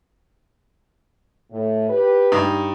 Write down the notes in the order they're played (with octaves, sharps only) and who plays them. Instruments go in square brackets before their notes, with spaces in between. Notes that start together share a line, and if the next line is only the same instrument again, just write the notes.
[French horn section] A2
G4 B4
[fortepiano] G2 D#4